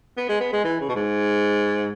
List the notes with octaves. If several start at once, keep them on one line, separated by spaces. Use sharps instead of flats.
B3
G#3
B3
G#3
E3
C#3
B2
G#2